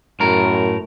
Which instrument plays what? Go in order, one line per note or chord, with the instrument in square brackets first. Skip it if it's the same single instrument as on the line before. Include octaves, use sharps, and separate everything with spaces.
[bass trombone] F#2 [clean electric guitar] A2 A#4